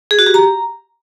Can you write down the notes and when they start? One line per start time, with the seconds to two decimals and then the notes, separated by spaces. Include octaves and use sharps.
0.11 G#4
0.19 F#4
0.26 G4
0.34 A#5